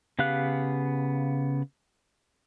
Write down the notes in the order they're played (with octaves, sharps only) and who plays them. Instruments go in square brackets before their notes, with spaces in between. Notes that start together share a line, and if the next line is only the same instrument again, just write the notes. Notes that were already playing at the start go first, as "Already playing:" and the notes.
[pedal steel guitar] C#3 B3 G4 F5 F#6